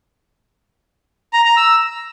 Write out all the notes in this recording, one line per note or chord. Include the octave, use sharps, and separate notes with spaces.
A#5
A#5
E6